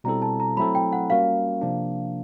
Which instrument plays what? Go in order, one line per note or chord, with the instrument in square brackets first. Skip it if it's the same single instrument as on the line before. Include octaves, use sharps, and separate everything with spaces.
[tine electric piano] B2 G3 C4 E4 A4 [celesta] A#5
[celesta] A5
A#5
[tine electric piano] F#3 A3 C4 E4 A4 [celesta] B5
[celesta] G5
F#5
[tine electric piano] G3 A#3 C#4 F#4 A#4 [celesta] F5
[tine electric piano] C3 F3 A#3 D4